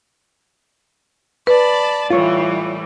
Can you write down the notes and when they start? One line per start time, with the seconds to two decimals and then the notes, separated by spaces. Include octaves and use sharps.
1.47 B4 D5 A5 B5
2.10 A2 E3 G3 F4 C#5